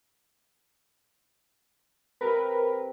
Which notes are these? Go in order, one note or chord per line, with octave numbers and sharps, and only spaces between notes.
C3 A#4 B4